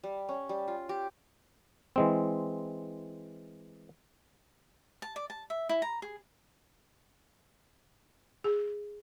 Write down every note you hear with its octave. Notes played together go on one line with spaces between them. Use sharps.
G3
C#4
G3
F4
G4
E3 G#3 C4
A5
D5
A5
E5
E4
A#5
G#4
G#4